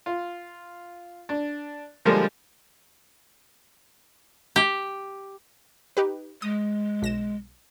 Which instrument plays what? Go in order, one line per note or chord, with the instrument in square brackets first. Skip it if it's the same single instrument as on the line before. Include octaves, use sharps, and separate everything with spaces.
[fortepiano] F4
D4
D3 F3 G3 G#3 A#3 D4
[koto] G4
[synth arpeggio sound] D#4 G4 B4
[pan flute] G#3 [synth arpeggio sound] D#6
[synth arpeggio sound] B1 A#6 E7